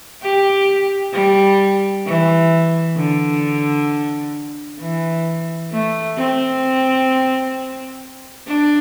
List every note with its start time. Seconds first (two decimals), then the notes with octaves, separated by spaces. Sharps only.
0.23 G4
1.13 G3
2.06 E3
2.96 D3
4.80 E3
5.72 A3
6.17 C4
8.48 D4